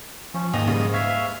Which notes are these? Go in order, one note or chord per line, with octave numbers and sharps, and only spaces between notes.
F3 C#4
D#2 G#2 A#3 D#5 D#6 F7
C#3 G3 A#3
E5 F5 C#6 G#6 B6